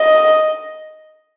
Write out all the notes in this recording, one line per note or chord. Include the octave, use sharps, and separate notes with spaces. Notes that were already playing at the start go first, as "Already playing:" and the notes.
Already playing: D#5